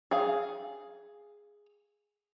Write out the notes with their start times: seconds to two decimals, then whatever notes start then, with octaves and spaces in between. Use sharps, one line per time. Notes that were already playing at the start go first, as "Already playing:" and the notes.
0.11 G#4 F5